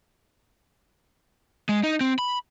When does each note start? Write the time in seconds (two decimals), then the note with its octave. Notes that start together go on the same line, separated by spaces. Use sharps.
1.69 G#3
1.83 D#4
2.01 C4
2.19 B5